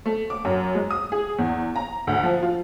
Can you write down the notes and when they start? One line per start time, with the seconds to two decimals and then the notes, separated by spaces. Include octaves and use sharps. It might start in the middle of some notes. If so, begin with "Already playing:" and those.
0.06 A3
0.30 D6
0.45 F#2
0.75 G#3
0.91 D#6
1.12 G#4
1.39 E2
1.76 A#5
2.07 D2
2.23 F3
2.43 F4